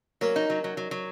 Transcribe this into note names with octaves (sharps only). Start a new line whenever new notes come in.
F#3 A#3 C#4
D#4
F#3
F#3
F#3
F#3